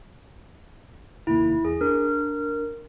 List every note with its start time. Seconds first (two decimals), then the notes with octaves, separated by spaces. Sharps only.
1.27 F1 D#2 A#3 E4
1.65 E2 G#4
1.81 D4 A#4